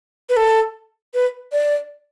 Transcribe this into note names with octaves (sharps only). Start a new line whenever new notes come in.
B4
A4
B4
D5